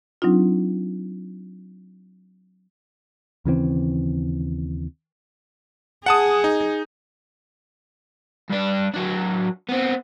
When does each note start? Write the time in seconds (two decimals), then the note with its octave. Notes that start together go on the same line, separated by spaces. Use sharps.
0.22 F#3 C4 D4 D#4 F4
3.45 D#2 C#3 E3 C4
6.06 G#4 F#5 A5 D#6
6.44 D#4
8.50 G2 D4
8.94 F#3 D4
9.69 B3 C4